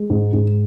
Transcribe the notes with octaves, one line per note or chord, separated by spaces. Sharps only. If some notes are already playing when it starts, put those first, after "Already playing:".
Already playing: G#3
G#2
G#2